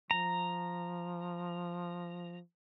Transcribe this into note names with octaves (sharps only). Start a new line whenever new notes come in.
F3 A#5